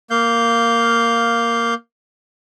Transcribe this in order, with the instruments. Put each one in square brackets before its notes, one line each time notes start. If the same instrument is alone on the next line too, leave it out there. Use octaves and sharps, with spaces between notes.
[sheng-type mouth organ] A#3 F5 G6